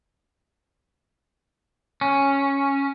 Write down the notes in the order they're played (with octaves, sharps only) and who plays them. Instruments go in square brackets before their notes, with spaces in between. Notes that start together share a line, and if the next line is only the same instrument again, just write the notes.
[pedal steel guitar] C#4